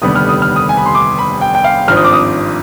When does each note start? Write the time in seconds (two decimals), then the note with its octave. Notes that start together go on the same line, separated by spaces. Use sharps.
0.02 F1 D#2 D3 G3 B3 D#6
0.16 F6
0.29 D#6
0.42 F6
0.56 D#6
0.69 G#5
0.77 B5
0.86 C6
0.95 D6
1.19 B5
1.41 G5
1.55 G5
1.64 F5
1.88 G#1 G2 F3 C4 F6
1.96 D#6
2.04 D6
2.13 D#6